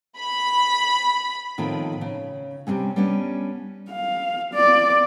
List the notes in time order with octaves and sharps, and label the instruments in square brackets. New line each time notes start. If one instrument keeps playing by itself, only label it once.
[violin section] B5
[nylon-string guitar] A2 D#3 F3 B3 C4 F4
C#3
C3 G3 G#3 C4 C#4
G3 B3 C#4 D4
[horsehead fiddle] F5
D5